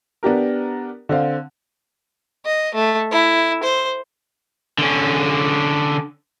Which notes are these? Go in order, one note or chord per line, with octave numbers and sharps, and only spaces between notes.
B3 D4 G4 A#4
D3 C4 F5
D#5
A3
E4
C5
D3 C#4